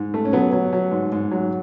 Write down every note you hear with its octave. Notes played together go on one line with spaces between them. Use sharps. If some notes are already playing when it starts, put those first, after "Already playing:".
Already playing: G#2
A3
C#4
F#3 B3
F#3
F#3
G#2
G#2
F#3